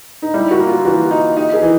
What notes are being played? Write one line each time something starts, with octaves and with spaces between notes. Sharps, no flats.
D#4
G3 E4
F#4
A#3
F4
E3 F#4
D#4
D#4 G4
G#4
E3